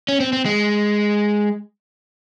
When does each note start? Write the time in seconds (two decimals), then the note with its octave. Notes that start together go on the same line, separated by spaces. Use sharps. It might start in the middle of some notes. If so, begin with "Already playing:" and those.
0.08 C#4
0.20 C4
0.33 C4
0.45 G#3